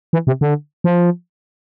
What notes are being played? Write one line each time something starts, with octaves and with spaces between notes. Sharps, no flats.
E3
C3
D3
F3